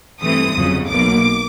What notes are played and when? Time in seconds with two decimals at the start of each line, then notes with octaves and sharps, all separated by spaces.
0.20 G2 E3 A3 C4 D#6
0.55 G1 F2 C#3 F#3
0.88 B1 B2 F#3 A#3 D6